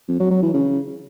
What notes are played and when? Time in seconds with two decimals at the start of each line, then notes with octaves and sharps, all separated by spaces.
0.08 F2
0.20 F#3
0.31 F#3
0.42 E3
0.54 C#3